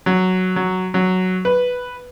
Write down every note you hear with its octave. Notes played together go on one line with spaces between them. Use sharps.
F#3
F#3
F#3
B4